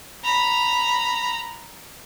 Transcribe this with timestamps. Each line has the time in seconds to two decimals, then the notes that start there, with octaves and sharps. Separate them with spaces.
0.24 A#5 B5